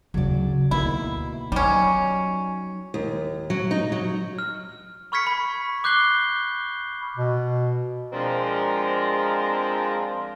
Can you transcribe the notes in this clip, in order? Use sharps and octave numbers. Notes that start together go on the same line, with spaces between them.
D1 C#3 F#3 D5
D2 B2 A#3 D#4 E4
F#3 G3 C#4 D#4 D#5
D#2
F#3
D#4
F#3
F6
B5 C#6 F6 G#6 B6 C#7
B5
D6 F#6 G6 C7 G7
B2
F3 G#3 C4 D4 F4 A#4